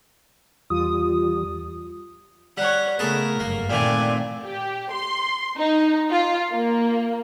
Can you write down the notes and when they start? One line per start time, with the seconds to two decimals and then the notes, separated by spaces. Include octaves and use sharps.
0.70 E2 G3 F4 D#6
2.57 G3 C#5 F#5
2.99 C#3 A3 B3 G#4 A#4 A5
3.40 G1 F#2 A#3
3.70 A#2 D#3 E3 A3 C4 D5 G#5
4.43 G4
4.92 C6
5.58 D#4
6.10 F4
6.52 A#3